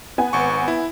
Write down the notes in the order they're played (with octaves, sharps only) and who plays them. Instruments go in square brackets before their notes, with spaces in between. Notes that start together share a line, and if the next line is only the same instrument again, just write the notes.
[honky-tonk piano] B3 G#5
[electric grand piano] G#1 C#6
E4